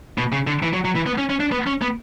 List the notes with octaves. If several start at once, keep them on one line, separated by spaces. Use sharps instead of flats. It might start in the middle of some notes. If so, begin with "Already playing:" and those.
B2
C#3
D3
E3
F#3
F#3
E3
B3
C#4
C#4
D4
B3
C#4
B3